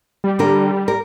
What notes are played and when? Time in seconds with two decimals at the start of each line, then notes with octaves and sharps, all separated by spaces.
0.24 G3
0.39 D3 D4 A#4
0.88 A#4